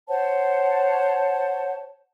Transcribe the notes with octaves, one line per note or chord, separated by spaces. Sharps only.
C5 C#5 F#5 A5